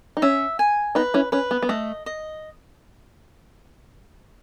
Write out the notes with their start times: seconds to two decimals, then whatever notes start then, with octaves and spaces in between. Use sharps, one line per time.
0.17 D#4
0.22 C#4 E5
0.59 G#5
0.95 B3 D#4 B4
1.14 C#4 E4
1.32 C#4 B4
1.51 B3
1.62 B3
1.69 A3 D#5
2.06 D#5